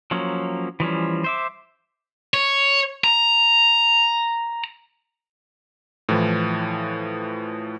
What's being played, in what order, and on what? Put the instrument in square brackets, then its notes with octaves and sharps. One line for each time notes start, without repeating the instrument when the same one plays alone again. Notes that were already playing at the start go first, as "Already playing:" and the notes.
[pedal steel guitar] F3 F#3 A#3 C#4
E3 F3 G3 C#4
C5 E5 D6
[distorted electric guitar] C#5
A#5
[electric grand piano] A2 E3 F3